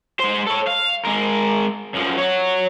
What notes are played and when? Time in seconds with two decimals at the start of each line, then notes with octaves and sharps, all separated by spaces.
0.20 G#3 C5
0.47 A4 C#5
0.67 F5
1.05 G#3 A#4
1.95 F#2 F3
2.18 F#4 C#5